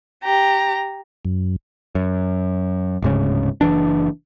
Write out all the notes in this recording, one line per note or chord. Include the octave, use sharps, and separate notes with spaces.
G4 A#5
F#2
F#2
D1 G#2 C#3
F#1 C2 E3 D4